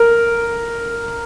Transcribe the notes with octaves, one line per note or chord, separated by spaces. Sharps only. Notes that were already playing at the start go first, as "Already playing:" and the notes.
Already playing: A#4